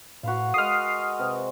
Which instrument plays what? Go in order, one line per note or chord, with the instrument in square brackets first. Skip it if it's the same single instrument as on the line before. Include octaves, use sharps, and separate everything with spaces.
[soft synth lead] A2 [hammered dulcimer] F#4 B4 F5
[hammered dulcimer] G#3 A#4 F#5 [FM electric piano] D#6 F6 [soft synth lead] C7
[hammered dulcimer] C3 [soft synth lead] B4